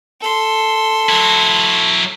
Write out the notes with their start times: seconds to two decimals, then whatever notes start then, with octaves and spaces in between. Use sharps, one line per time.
0.21 A4 C6
1.09 F#3 E4